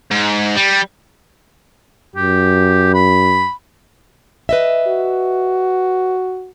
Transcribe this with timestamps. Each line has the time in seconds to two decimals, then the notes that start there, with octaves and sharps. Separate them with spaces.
0.11 G#2
0.56 G3
2.16 F#2 G4
2.94 B5
4.49 B4 D#5 E5
4.87 F#4